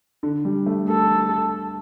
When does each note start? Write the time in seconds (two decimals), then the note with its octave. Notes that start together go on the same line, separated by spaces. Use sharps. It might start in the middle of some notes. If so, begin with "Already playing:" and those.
0.23 D3
0.45 G3
0.66 A3
0.89 A4